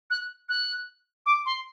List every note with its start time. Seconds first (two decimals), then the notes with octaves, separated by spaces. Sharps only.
0.10 F#6
0.49 F#6
1.26 D6
1.46 C6